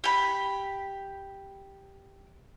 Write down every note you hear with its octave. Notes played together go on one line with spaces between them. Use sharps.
G4 B5